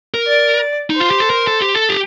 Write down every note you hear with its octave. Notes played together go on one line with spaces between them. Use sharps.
A#4
D5
D#4
F4 C5
G4
A4
A#4
A4
G4
A4
G4